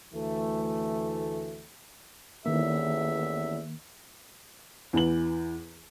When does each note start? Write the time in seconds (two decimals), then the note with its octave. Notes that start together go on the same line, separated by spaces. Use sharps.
0.13 D2 E3 A3
2.46 A1 E2 D#3 A#3 E5
4.93 E2 E3 B4 F#7